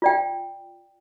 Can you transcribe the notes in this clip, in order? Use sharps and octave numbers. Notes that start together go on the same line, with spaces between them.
F4 D5 G5